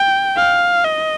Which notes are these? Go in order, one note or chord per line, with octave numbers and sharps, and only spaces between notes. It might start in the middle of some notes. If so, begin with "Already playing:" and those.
Already playing: G5
F5
D#5